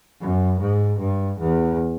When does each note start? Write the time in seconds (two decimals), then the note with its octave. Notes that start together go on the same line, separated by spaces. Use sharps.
0.21 F#2
0.60 G#2
0.99 G2
1.39 E2